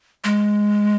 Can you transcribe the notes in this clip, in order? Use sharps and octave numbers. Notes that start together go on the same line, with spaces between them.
G#3